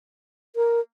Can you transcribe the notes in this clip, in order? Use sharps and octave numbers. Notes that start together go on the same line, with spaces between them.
A#4